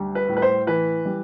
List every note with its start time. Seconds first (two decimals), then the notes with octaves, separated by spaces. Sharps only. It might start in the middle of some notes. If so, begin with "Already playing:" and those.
Already playing: D2 G3
0.15 B4
0.29 A2
0.37 B4
0.42 C5
0.67 E3 B4
1.05 G3